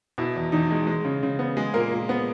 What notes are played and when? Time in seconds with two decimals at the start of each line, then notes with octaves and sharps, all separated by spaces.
0.18 B2 E4
0.36 E2
0.52 E2 D#4
0.71 G#3
0.87 G#3
1.05 C#3
1.23 C#3
1.39 B3
1.57 G#3 G#4
1.74 A#2 A#3 A#4
1.92 A#2
2.09 B3